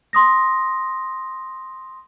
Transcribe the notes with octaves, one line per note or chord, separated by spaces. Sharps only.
C6 D#6 A#6